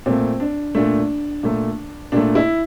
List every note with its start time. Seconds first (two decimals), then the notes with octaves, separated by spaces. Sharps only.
0.06 A#2 A3 C4
0.40 D4
0.75 A#2 A3 D4
1.43 A#2 A3
2.12 A#2 A3 D4
2.35 E4